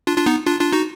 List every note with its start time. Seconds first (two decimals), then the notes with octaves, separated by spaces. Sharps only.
0.07 D4 F4
0.17 D4 F4
0.26 B3 D#4
0.46 D4 F4
0.60 D4 F4
0.72 D#4 F#4